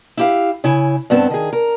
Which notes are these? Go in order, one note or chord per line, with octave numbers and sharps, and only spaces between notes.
E4 G4 F5
C#3 E4 G#5
G2 B3 C4 G#4 A4
D#3 G#4
A#4